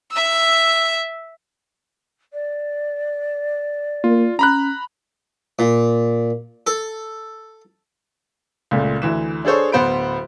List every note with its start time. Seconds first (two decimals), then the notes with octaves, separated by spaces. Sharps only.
0.12 E5 E6
2.33 D5
4.04 A#3 F4
4.39 C#4 A#5 B5 F#6
5.59 A#2
6.67 A4
8.71 C#2 A#2 A3
9.02 D2 E3 E7
9.45 D4 G#4 A4 C5 C#5
9.72 D1 B3 C5 B5 D7